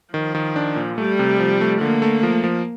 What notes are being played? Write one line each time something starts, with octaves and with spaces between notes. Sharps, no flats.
D#3 F3
D#3
D4
A#2
G3 A3
C3
F3
A3
D3 A#3
A3
F3
F3